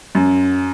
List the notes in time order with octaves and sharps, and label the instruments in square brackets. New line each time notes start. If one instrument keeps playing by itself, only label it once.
[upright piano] F#2